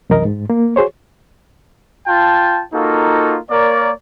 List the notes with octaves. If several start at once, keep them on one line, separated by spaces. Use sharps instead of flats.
C2 F#2 E3 A#4 D#5
G#2
A#3
F#4 G#4 C5 C#5
F4 G5 A5
A#3 D#4 F4 F#4 A4
A#3 A#4 C#5 D5